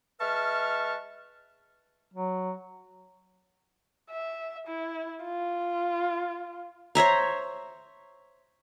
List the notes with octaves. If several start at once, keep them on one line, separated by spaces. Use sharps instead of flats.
G#3 B4 E5 A5 C#6 F6
F#3
E5
E4
F4
C5 C#5 E5 A#5